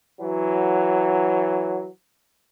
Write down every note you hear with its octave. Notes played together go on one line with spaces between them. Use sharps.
E3 F#3